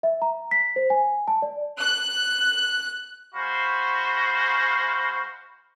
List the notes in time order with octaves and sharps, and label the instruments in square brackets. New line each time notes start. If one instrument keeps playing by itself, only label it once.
[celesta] E5
A#5
B6
C5
G#5
A5
D5
[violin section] F#6
[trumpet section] G#3 F#4 C5 F5 B5